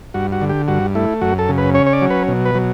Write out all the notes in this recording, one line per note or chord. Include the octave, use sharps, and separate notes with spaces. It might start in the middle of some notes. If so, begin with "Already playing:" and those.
G2 F#4
F#4
D3
G4
G2 F#4
A3 E4
F#2 F#4
A4
C#3
B4
C#4 C#5
C#5
D5
F#3
B4
B2
B4
F#3